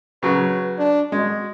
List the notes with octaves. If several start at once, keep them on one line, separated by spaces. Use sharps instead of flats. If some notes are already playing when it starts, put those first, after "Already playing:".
C#3 F#3 B4
D4
G#3 F#4